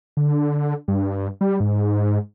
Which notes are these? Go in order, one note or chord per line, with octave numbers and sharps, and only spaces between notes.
D3
G2
G3
G#2